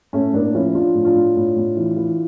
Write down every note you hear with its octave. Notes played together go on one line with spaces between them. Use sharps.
A2 A3 C#4
A2 A#3 D4
F3 C#4 E4
F3 D4 F4
A2
D4 F4
A2
A2
A2
E3
E3